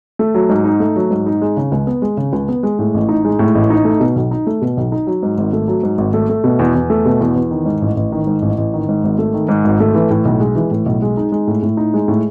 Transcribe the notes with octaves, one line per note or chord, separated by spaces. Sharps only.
A3
F#3
G#2
D#4
A3
F#3
G#2
D#4
G#3
C#3
C#2
B3
G#3
C#3
C#2
B3
G#3
A2
A1
D#4
G#3
A2
A1
D#4
A3
B2
B1
D#4
A3
B2
B1
D#4
F#3
G#2
G#1
A3
F#3
G#2
G#1
A3
A3
B2
E2
E2
A3
B2
E2
E2
D#3
G#2
A1
A1
D#3
G#2
A1
A1
D#3
G#2
G#1
A3
D#3
G#2
G#1
A3
E3
A2
B1
G#3
E3
A2
B1
G#3
D#4
G#3
A2
A2
D#4
G#3
A2